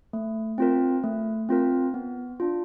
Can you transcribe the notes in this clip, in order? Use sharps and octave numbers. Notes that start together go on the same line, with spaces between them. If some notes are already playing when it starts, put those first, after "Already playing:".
A3
C4 F4 A#4
A3
C4 F4 A#4
B3
D4 F4